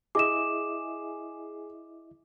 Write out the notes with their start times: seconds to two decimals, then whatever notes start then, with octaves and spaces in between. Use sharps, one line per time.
0.15 E4 G#4 D#5 E5 D6 E7